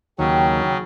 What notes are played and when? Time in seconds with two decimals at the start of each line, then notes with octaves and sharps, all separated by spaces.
0.19 D#2 C#3 F#3 C#4 G5